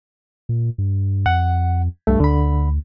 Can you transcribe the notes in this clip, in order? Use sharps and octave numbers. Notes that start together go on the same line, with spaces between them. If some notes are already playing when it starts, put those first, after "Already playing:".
A#2
G2
F2 F#5
C2 G2 A3
D2 D3 B5